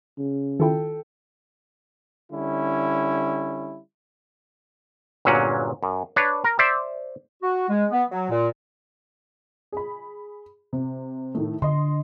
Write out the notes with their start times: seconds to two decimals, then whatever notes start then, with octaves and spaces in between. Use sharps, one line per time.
0.18 C#3
0.60 D#3 E4 F4 A4 G5
2.32 D3 G3 C#4 E4
5.25 G1 A#2 F#3 C#4 F#5
5.83 F#2
6.16 D4 B4 C#5
6.44 A#4
6.59 C5 D5 E5
7.41 F#4
7.69 G#3
7.90 B3
8.10 F#3
8.29 A#2
9.72 G#4 B5
10.73 C3
11.35 A2 D#3 A3
11.62 D3 D#5 C6